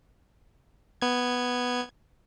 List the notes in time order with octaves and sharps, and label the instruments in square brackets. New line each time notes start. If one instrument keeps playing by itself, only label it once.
[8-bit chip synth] B3 G#6